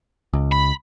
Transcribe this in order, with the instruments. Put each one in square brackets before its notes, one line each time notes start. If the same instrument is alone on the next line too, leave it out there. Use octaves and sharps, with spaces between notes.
[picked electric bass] C#2
[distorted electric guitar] B5